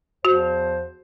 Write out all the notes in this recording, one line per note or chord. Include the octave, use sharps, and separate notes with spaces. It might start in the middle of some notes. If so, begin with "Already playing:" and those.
E2 F3 F#4 C5